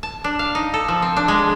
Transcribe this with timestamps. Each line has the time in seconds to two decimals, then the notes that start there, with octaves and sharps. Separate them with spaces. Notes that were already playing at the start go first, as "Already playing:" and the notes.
0.03 A5
0.24 D4
0.39 F5
0.55 D#4
0.74 A4
0.88 F3
1.02 C4
1.16 D4
1.28 G#3